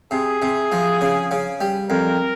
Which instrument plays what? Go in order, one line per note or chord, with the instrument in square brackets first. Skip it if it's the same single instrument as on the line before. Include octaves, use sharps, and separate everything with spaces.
[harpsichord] C3 [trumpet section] G#4
[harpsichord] C3
F3
C#3
C#3
G3
[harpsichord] F2 [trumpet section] A#4